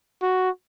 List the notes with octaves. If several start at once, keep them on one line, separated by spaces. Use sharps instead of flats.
F#4